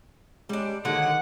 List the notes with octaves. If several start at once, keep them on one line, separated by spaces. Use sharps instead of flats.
G3 G#3 C#4 D4
D3 D#3 F#3 G#3 A#3 F#5